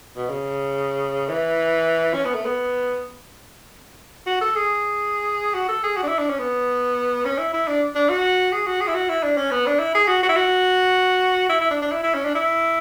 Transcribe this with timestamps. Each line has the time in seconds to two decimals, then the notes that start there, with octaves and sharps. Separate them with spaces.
0.16 B2
0.30 C#3
1.29 E3
2.14 C#4
2.25 B3
2.34 A3
2.45 B3
4.26 F#4
4.41 A4
4.55 G#4
5.54 F#4
5.69 A4
5.84 G#4
5.97 F#4
6.03 D4
6.08 E4
6.19 D4
6.29 C#4
6.39 B3
7.25 C#4
7.39 E4
7.53 E4
7.68 D4
7.95 D4
8.09 F#4
8.53 G#4
8.67 F#4
8.81 G#4
8.87 E4
8.94 F#4
9.09 E4
9.23 D4
9.37 C#4
9.51 B3
9.66 D4
9.79 E4
9.95 G#4
10.08 F#4
10.23 F#4
10.29 E4
10.36 F#4
11.49 E4
11.61 E4
11.71 D4
11.82 D4
11.92 E4
12.04 E4
12.14 C#4
12.25 D4
12.35 E4